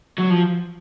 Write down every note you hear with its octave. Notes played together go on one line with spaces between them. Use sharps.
F#3
F3